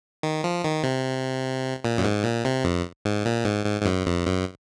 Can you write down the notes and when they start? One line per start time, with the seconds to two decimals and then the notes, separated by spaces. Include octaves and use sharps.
0.23 D#3
0.44 F3
0.64 D#3
0.84 C3
1.85 A#2
1.98 F#2
2.04 G#2
2.25 A#2
2.45 C3
2.64 F2
3.05 G#2
3.26 A#2
3.45 G#2
3.65 G#2
3.81 G#2
3.85 F#2
4.06 F2
4.26 F#2